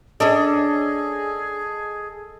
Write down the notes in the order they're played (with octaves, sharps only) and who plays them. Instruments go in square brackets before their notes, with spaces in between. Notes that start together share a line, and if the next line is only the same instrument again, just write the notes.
[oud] C#4 D4 [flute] G#4 [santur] A4 D#5